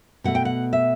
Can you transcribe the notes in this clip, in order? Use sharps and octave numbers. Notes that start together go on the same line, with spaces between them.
B2 A3 F#5
G5
F#5
E5